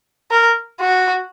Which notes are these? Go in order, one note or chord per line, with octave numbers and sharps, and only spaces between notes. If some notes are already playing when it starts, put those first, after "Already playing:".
A#4
F#4